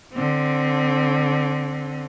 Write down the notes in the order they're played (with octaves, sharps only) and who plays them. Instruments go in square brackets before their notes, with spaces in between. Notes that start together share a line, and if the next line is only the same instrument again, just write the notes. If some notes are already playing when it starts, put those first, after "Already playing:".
[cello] D3 C4